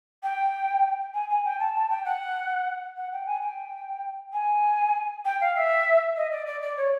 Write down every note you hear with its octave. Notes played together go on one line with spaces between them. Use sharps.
G5
G#5
G#5
G5
A5
A5
G5
F#5
F#5
G5
G#5
G5
G#5
G5
F5
E5
D#5
D5
D5
D5
C#5